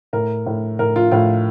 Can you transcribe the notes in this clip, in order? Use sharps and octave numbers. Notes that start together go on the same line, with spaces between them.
A2 A#4
A2
A2 A#4
F4
A2 F4